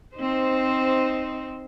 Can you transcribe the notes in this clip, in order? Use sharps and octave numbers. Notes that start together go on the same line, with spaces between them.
C4 D#4 C5